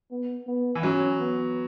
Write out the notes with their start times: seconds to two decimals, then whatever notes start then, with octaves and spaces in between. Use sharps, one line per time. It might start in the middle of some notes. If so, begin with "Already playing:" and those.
0.11 B3
0.47 B3
0.75 E3
0.83 F#3 C#4
1.20 B3